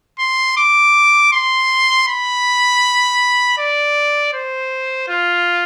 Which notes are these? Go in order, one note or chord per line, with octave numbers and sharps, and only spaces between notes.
C6
D6
C6
B5
D5
C5
F4